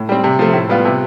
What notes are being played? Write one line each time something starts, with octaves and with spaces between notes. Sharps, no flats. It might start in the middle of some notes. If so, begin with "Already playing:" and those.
Already playing: A2
G3 C4
C3
F3 A3
A2
G3 B3 F4
C3